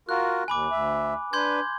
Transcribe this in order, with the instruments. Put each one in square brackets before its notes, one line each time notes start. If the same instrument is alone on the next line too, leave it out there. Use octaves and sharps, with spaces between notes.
[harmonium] F4 F#4 A#4 [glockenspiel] F#6
[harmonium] D#2 [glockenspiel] G#5 B5 D6
[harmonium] D2 E5
[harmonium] D4 B4 [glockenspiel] C6 G6 G#6